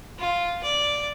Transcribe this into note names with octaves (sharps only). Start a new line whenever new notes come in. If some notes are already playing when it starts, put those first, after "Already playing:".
F4
D5